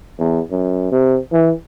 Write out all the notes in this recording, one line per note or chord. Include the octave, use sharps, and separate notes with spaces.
E2
F#2
C3
E3